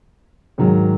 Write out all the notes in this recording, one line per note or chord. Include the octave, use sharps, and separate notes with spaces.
G#2 D#3 F#3